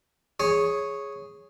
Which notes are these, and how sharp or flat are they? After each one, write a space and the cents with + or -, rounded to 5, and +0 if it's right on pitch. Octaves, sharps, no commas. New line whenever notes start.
G#4 +0 C#5 -5